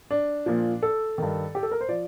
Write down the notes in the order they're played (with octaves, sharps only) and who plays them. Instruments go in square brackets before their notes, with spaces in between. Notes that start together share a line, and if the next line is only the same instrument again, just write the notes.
[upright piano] D4
A#2 F3
A4
G2 D#3
G4
A4
A#4
C5
F3 D5